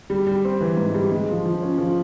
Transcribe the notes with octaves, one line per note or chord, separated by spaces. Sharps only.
G3
G3
C4
E3
G#2
G3
G#3
F3
F3
C#4
F3